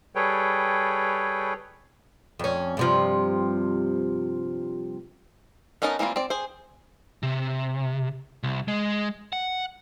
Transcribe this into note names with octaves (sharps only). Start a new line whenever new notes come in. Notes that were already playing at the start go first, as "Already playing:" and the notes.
G3 G#4 A4 B4 C#5 G5
F2 C#4
G2 C3 F3
B3 C#4 D#4 A#4 A5
E3 G3 A#3 C4 F4
C4 D5
G#4 C5
C3
C2
G#3
F#5